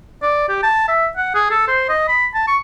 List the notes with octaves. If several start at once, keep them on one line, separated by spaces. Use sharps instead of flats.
D5
G4
A5
E5
F#5
G#4
A4
C5
D#5
B5
A5
C#6